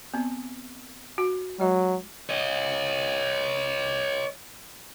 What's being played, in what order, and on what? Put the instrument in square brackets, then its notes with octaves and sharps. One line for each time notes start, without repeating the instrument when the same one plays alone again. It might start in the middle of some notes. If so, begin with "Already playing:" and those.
[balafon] B3 C4
F#4
[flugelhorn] F#3 [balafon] G#3 D#5
[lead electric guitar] C#5 D#5